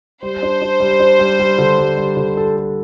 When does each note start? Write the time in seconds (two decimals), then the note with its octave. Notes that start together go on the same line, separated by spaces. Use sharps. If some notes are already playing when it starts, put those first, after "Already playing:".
0.23 G3 C5
0.42 D4
0.62 D4
0.80 G3
1.00 D4
1.19 G3
1.39 G3
1.58 D3
1.78 G3
1.97 G3
2.17 D3
2.37 A4
2.57 A4